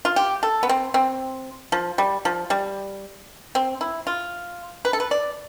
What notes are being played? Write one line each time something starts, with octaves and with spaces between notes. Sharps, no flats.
F4
G4
A4
B3
C4
C4
F3
G3
F3
G3
C4
E4
F4
B4
A4
B4
D5